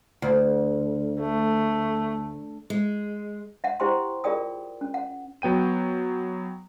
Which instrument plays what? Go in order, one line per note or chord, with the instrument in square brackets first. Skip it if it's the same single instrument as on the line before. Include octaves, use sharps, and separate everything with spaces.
[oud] D2
[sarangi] A3
[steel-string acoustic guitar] G#3
[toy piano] E5 F#5
E4 G4 C5 G5 C6
F4 G#4 A#4 D5 G5 D#6
C#4
F#5
[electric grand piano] F#3 B3 G5 D#7